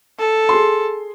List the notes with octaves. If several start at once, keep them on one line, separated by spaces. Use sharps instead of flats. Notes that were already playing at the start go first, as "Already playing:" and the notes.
A4
G#4 C6